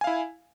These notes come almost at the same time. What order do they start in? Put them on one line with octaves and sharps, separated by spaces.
G#5 F5 E4